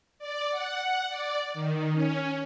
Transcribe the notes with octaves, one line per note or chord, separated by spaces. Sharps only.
D5
F#5
D5
D#3
C#4